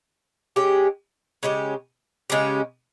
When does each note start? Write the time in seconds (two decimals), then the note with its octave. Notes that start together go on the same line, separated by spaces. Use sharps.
0.56 G#3 C#4 G4
1.43 C#3 G#3 C#4 G4
2.30 C#3 G#3 C#4 G4